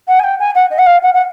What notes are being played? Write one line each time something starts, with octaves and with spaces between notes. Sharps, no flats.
F#5
G#5
G5
G#5
F#5
D#5
F#5
F5
F#5
F#5